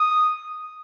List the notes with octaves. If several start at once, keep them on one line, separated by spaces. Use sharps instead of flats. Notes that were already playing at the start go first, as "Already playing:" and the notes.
Already playing: D#6